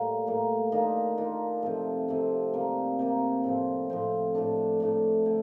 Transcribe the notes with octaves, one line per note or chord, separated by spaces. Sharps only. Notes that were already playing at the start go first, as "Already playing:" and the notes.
Already playing: A2 G3 A#3
A2 G3 A#3
D#3 A#3 D4 F4
D#3 A#3 D4 F4
C3 F3 A3
C3 F3 A3
C3 G3 A#3
C3 G3 A#3
A2 F3 C4
A2 F3 C4
A2 A3 D4
A2 A3 D4
D3 A3